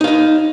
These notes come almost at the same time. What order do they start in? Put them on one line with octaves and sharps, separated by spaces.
D#4 F5 D#5